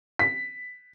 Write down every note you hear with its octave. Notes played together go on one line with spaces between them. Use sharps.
B6